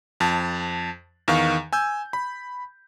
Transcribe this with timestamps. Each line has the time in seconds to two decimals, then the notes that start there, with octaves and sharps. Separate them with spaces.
0.20 F2 A5
1.28 E2 D#3 F5 C#6
1.73 G#5 E6 G6
2.13 B5